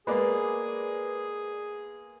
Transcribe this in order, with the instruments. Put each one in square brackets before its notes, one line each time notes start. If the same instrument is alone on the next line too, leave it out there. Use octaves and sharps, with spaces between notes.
[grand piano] G#3 A#3 B3 [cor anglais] G#4 [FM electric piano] B4 D5